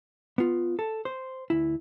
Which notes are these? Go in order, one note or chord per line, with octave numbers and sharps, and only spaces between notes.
B3 F4
A4
C5
D2 E4